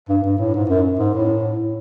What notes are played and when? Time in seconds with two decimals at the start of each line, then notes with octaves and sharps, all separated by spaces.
0.09 G2
0.24 G2
0.38 A2
0.54 G#2
0.70 F#2
0.99 G#2
1.15 A2